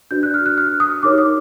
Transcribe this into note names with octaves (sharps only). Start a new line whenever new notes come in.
D4 F#4 B4 D5 G6
F#6
F6
F#6
F6
D#6
D#4 G4 A#4 C#5 D6
D#6